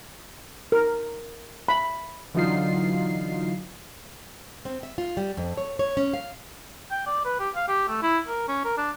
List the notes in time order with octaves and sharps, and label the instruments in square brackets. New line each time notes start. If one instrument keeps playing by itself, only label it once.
[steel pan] A#4
B5
[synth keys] D3 E3 F#3 D#4 F4 C7
[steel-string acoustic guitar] C4
E5
F4
G3
F2
C#5
C#5
C#4
F5
[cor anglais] G5
D5
B4
G4
F5
G4
A3
E4
A#4
C#4
A#4
D4